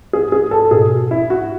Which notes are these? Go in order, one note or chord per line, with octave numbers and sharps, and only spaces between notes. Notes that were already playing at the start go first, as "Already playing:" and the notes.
G#4
G#4
A4
B2 G#4
E4
F#4